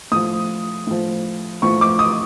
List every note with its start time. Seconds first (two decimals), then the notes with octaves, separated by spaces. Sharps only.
0.12 A2 F3 D#6
0.87 A2 F3
1.62 A2 F3 C#6
1.81 D6
1.99 D#6